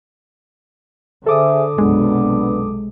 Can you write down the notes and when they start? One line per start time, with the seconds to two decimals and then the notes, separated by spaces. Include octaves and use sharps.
1.26 D3 G#4 A4 C5 E5 D6 D#6
1.78 B1 F#2 C3 G#3 B3 D4